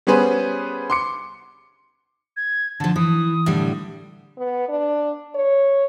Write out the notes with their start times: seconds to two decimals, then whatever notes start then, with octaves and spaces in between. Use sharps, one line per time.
0.07 G3 B3 C#4 G#4 B4 C5
0.90 C6 D6 C#7
2.37 G#6
2.80 D3 F3 A5
2.96 E3 D#6
3.46 A2 D3 G3
4.38 B3
4.69 D4
5.35 C#5